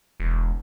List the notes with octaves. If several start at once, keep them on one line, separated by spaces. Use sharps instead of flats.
E1